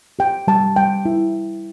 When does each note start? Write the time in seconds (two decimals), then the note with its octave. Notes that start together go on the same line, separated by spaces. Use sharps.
0.19 G4 G5
0.48 G3 A5
0.76 G3 G5
1.05 E4